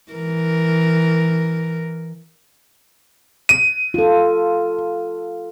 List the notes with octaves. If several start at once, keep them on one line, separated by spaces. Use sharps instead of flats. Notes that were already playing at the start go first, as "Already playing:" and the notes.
E3 A#4
D#7
F4 A4